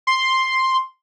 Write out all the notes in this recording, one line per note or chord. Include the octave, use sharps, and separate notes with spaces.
C6